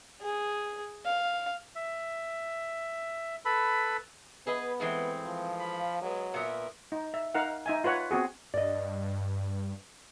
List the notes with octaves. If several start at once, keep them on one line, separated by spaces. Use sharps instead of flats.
G#4
F5
E5
A4 B4 B5
B3 G#4 B4 D#5
E3 G#3 A3 C4
F3
F5 B5
F#3 G#3 B3
A#2 B3 A#4 E5
D#4
E5
D#4 A#4 F5 F#5
D#4 E5 G#5
F4 B4 C#5 F#5
B3 C4 F#4 G#4
G2 D5 D#5